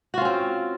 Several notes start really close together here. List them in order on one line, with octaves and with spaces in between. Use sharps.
F#4 F4 C#4 C4